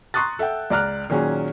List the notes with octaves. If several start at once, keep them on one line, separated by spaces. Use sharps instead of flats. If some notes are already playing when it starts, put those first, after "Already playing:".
A#5 C6 C#6 D#6 F#6 A6
A4 E5 F#5 G5
C#2 D5 A#5 F6 F#6
A#2 D#3 F#3 C#4 G#4